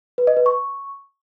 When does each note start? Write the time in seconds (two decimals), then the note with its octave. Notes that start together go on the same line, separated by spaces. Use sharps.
0.18 B4
0.27 D#5
0.37 B4
0.46 C#6